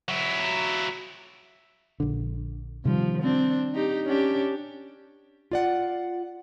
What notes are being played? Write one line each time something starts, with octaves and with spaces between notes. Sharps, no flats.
F#3 E4
A#1 D3
C3 D#3 F3 G3
C4 D4
D#4 G4
C#4 D4 G4
F4 D5 F#5